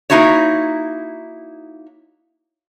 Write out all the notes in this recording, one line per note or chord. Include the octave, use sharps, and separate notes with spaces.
A#3 C#4 D#4 E4 F#4 C#5